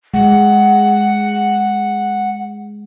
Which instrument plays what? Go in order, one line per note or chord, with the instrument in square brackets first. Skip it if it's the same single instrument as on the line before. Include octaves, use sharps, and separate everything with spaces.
[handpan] G#3 [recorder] F#5